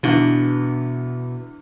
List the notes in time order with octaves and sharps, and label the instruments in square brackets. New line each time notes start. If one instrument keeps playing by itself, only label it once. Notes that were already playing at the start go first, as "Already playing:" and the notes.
[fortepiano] E2 D3 [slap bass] B2